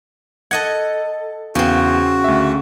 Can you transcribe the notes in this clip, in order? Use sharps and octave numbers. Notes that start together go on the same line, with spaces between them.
A4 D#5 F#5 G#6
E2 C#3 C4 F#4
D2 E5